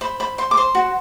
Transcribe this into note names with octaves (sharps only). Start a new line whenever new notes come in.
C5 B5
C5 B5
C5 C6
D6
C5 C6
F#4